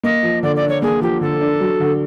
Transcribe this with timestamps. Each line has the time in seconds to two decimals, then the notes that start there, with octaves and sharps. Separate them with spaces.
0.03 A#3 D#5
0.23 F3
0.43 D3 D5
0.56 D5
0.62 D4
0.69 C#5
0.82 A#3 G#4
1.02 F3 G4
1.21 D3 A4
1.41 D4
1.60 F#3
1.80 D3